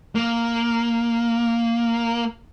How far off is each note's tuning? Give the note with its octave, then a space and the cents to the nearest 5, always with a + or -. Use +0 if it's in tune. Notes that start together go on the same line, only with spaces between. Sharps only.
A#3 -5